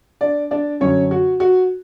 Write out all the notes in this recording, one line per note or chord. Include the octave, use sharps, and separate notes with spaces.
D4 D5
D4 D5
F#2 D3 F#3 C#4 C#5
F#4
F#4